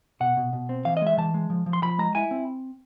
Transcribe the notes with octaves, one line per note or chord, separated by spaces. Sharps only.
B2 F#5
B2
B2
C4
E3 F5
D#5
G#3 E5
E3 A5
G#3
F3
F3
C6
F3 B5
G#3 A#5
E4 G#5
C4